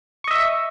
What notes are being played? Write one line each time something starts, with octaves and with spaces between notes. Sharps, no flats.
D#5 E5 C#6